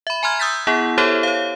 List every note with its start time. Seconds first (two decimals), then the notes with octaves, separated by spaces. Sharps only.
0.07 E5 B5
0.23 G#5 A#5 C6 F6 G#6
0.39 D#6 E6 G6 A6 B6
0.67 B3 E4 G#4 F#5
0.98 E4 G4 A4 C5 C#5 E5
1.23 C#5 F5